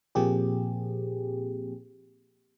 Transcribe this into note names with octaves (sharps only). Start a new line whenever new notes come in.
A#2 F3 A#3 C4 G4 G#4